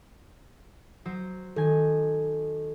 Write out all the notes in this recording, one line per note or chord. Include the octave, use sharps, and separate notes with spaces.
F#3 C5
D#3 A4 G#5